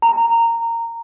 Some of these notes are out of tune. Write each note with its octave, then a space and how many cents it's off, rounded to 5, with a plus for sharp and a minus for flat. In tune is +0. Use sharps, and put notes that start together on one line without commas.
A#5 -15